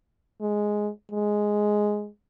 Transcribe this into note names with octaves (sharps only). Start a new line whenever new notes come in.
G#3
G#3